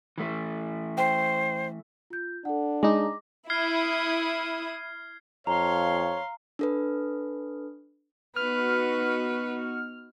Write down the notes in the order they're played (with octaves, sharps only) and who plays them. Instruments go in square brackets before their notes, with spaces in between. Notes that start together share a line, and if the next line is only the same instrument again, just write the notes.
[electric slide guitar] E3 A3
[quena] C5 [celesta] G5
[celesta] F4 G6
[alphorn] D4 [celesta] A4 F#5
[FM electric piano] G#3 D#4 [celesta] D6 A#6
[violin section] E4 D#6 [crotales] F6 G#6 C7
[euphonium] F2 [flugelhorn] C#5 [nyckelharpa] F5 C6 [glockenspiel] A#5
[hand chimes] D4 A4 B4
[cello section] B3 D#4 F#4 [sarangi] B4 [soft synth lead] F6